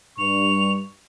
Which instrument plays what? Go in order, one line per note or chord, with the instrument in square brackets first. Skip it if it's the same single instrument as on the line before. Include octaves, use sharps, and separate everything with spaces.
[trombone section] G2 [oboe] C#6 [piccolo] F7